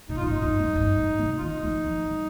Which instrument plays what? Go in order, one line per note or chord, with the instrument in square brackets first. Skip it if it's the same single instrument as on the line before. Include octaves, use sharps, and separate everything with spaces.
[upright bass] A#2 [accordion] D#4
[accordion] F4
[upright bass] G2
[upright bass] A2 [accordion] D#4
[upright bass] G2
F2
G2
A2
C3
[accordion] F4
[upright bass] D#3 [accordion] D#4
[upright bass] F3
F3
G3